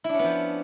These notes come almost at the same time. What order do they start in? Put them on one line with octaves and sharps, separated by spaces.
E4 D4 C#4 B3 F3